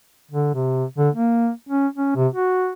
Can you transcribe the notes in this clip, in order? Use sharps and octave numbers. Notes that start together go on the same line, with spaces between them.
D3
C3
D3
A#3
C#4
C#4
C3
F#4